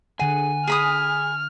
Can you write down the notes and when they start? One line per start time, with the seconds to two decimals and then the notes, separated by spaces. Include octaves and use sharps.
0.20 D3 G#4 F#5 G#5
0.67 G#4 B5 D#6 F6